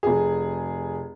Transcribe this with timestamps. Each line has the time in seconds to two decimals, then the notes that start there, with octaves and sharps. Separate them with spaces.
0.03 F1 G#4